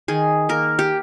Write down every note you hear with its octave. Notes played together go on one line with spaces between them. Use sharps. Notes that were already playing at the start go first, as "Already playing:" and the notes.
D#3 G#4
A#3 A#4
G4